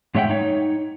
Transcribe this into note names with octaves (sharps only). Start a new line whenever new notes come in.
G#2 G#3 C#5 E5 F#5 G5
D#4 C#5